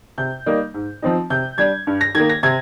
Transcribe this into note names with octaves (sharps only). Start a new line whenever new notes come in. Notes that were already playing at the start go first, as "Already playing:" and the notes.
C3 G6
G3 A#3 D#4
G#2
F3 C4 D#4
C3 G6
G3 D4 G#6
G2
A#6
D#3 A#3 G#6
A#6
C3 G#6